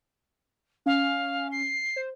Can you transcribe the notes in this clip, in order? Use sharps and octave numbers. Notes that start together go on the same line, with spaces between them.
C#4 F5
C7
C5